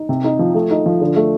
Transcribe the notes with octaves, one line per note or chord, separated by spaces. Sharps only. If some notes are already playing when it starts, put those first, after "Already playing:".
Already playing: D#4
C3
D#4
F3
A3
D#4
F3
D3
A3